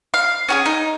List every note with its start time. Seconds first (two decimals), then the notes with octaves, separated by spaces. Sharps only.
0.14 F5
0.49 C#4 F#4 G#4
0.66 D#4